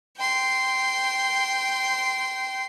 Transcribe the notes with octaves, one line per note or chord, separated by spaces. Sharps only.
G5 C6